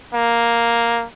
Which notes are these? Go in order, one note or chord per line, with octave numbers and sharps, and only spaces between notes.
A#3